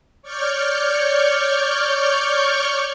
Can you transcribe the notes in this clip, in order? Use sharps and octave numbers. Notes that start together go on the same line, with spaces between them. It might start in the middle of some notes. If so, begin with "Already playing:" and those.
C#5 D5 C#6 F6 G6